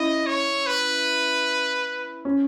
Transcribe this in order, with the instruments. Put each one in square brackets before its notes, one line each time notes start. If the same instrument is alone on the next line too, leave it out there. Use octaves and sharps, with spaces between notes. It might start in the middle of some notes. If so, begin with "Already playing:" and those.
Already playing: [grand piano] C#4 E4 [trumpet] D#5
[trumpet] C#5
B4
[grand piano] C#4